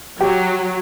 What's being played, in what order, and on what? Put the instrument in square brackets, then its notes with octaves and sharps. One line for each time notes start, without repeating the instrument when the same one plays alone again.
[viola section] F#3 [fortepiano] G4